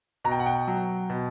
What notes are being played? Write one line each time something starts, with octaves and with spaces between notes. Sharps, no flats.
B2 A#5
G5
F#5
G5
F#3
B2